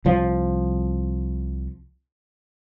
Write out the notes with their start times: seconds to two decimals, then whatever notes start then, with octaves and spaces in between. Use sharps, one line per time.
0.05 C2 F3